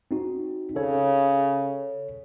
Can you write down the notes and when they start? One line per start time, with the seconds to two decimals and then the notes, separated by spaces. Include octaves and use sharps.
0.11 C4 D#4 F#4
0.76 C#3 A4 C#5